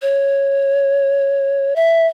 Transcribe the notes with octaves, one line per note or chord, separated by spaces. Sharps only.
C#5
E5